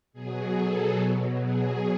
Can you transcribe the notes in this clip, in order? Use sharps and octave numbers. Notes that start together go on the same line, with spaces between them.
B2 F#3 G#4
A4
B2 F#3
G#4